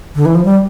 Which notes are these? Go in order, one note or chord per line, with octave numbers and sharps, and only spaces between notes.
D3
E3
F3
G3